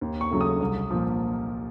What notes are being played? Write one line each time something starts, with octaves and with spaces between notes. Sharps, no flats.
D#2
C#6
C#3 F#3 A3
D#6
C2
A#2 F3